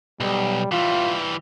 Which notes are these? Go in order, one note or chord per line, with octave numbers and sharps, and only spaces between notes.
B1 G3
E3 G3 F4